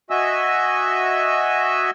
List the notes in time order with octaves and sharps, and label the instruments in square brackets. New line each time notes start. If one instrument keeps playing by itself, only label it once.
[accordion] F#4 D#5 E5 G#5 E6